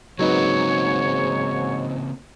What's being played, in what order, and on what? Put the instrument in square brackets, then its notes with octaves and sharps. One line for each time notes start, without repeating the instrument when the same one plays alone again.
[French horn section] G#2 [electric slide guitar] C#3 A#3 C4 [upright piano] F#3 D#4 B4 [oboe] C#5